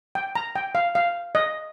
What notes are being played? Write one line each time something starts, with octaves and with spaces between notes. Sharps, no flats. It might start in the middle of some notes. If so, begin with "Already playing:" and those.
G5
A#5
G5
F5
F5
D#5